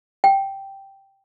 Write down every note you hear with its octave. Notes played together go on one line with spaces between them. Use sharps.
G5